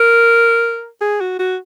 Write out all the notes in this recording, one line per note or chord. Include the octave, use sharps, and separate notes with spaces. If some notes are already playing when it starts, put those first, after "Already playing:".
Already playing: A#4
G#4
F#4
F#4